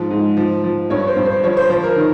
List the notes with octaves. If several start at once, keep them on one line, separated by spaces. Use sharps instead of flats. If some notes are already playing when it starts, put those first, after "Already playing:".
Already playing: G#2 F3
G#2
F3
F3
G2 C#5
C5
G2
C5
F3 C#5
C5
F3 C5
A#4
D#3